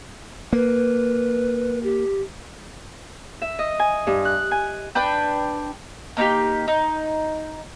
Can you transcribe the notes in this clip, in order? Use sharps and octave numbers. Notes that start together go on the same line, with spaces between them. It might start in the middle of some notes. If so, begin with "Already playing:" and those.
A#3 B4
G4
E5
D#5
G#5
G2
F#6
G#5
D4 B4 G5
A#3 D#4 F4 G4
D#4